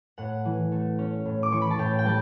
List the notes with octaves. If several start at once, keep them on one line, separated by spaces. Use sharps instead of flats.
A2 F#5
E3
A3
C#4
A2
D6
E3 C#6
B5
A5
A2 G5
G5
G3 A5